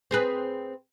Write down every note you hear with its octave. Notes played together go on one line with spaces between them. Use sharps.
C4 G#4 B4